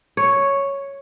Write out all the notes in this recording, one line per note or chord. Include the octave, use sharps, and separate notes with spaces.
C#5